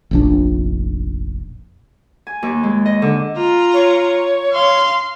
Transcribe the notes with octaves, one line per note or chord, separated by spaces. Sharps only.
F1 A#1 D4
G#5
D#2
G#3
D#5
D3
F4 A#5
C#5
F5 C6